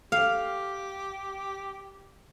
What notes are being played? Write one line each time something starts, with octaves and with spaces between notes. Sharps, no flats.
G4 F5